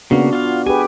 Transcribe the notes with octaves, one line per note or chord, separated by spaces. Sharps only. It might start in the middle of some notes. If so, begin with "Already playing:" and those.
C#3 A#3 B3 D4 F#4
F4 F5
G4 G#4 B4 G#5